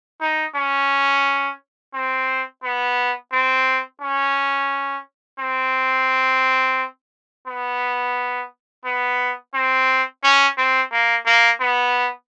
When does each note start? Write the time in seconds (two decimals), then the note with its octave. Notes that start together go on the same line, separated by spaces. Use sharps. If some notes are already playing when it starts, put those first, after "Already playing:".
0.21 D#4
0.56 C#4
1.94 C4
2.63 B3
3.32 C4
4.01 C#4
5.39 C4
7.47 B3
8.85 B3
9.54 C4
10.23 C#4
10.57 C4
10.92 A#3
11.26 A#3
11.61 B3